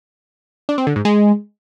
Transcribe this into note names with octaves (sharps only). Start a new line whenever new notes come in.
D4
C4
D3
G#2
G#3